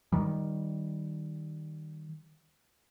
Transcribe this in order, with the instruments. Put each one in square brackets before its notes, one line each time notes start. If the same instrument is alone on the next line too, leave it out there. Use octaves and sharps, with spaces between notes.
[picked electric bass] D#3 G3